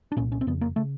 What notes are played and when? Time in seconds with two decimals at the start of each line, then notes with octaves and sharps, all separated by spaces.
0.12 D4
0.17 C2 A#2 C#4
0.32 C#4
0.41 C4
0.47 F2 C#3 B3
0.61 A#3
0.76 C#3 A3